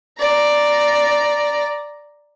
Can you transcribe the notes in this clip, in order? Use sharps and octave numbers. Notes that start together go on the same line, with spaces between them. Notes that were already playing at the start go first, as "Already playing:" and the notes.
D5 A#5